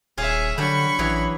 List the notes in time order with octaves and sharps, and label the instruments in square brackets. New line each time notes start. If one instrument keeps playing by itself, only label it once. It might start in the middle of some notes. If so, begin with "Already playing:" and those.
[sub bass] D#1 [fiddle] G#4 E5 [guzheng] C#5 F5
[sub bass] D3 [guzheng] F#3 G3 D4 [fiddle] B5 C#6
[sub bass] A1 [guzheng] E3 F#3 G#4